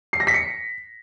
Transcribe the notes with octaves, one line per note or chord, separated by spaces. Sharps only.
C7
A#6
B6
C#7